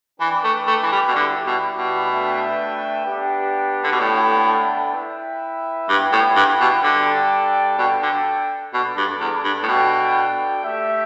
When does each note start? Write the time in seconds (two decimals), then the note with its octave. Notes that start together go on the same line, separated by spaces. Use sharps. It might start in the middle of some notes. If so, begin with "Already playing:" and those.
0.20 E3 D4 B4 D5 G5
0.44 A3
0.67 A3
0.83 E3
0.92 G3
1.08 B2
1.15 D3 G3 E4 G4 D5 G5
1.47 B2
1.78 B2
2.10 A3 D4 B4 E5 G5
3.05 B3 D4 G4
3.84 D3
3.92 B2
3.99 A2 B3 D4 A4 E5 G5
4.94 E4 B4 E5 G5
5.89 G2 G3 B3 E4 B4 G5
6.12 A2
6.36 G2
6.60 B2
6.83 D3 G3 D4 A4 D5 G5
7.78 B2 D4 A4 G5
8.02 D3
8.74 B2 D4 A4 D5
8.97 G2
9.21 E2
9.44 G2
9.63 A2
9.68 B2 D4 A4 D5 G5
10.64 A3 G4 E5